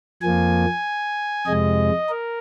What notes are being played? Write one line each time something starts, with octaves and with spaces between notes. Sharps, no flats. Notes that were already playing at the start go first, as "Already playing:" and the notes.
F2 F3 A#3 G#5
F2 C3 G#3 D#5
A#4